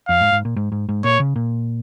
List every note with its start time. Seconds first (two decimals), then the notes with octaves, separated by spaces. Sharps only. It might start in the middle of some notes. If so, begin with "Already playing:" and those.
0.08 F2 F5
0.21 G#2
0.32 G#2
0.45 A#2
0.56 G#2
0.72 G#2
0.89 G#2
1.04 A#2 C#5
1.20 C#3
1.36 A#2